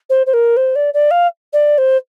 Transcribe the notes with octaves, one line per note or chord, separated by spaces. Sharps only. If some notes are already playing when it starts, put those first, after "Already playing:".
C5
C5
A#4
C5
D5
D5
F5
D5
C5